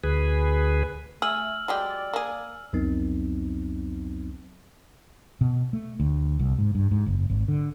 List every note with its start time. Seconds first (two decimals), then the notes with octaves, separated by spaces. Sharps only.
0.04 D2 G#4 B4
1.22 A3 G#4 E6 F6 F#7
1.68 F#3 G#3 G4 D5
2.14 A#3 G#4
2.73 C2 F2 F#3 B3 C4 D#4
5.41 B2
5.73 A3
6.00 D2
6.39 C2
6.59 G#2
6.75 G2
6.91 G#2
7.06 F#1
7.30 G#1
7.48 D3